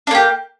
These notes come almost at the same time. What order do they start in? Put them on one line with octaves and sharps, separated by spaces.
D4 A#3 G4